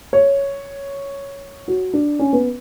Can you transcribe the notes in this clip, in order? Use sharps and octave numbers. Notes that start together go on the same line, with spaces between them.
C#5
F#4
D4
C#4
B3